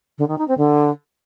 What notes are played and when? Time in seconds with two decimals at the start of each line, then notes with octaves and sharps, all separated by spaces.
0.18 D3
0.28 D#3
0.38 D#4
0.48 C4
0.57 D3